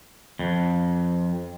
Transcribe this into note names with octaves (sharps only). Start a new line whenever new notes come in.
F2